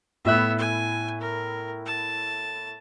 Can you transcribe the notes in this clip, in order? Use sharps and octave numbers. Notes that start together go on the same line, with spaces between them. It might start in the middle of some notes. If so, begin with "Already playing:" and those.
A2 B3 E4 E5 F#6
G#5
A#4
A5